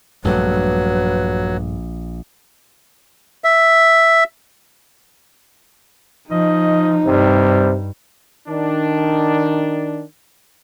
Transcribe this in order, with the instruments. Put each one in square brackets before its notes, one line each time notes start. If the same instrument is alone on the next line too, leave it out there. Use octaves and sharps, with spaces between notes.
[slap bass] A#1 [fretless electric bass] G2 G3 A3 [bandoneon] F#3 [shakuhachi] B4
[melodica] E5
[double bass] F3 [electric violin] D#4 [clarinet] D#5
[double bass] G2 [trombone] C3 [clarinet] G3
[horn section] D#3 D4